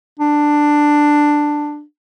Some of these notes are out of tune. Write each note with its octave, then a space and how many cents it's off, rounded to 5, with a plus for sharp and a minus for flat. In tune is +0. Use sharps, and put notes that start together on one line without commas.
D4 +10